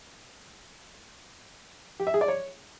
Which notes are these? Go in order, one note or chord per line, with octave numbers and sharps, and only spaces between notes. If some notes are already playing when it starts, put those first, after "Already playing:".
G4
E5
G#4
D5
C#5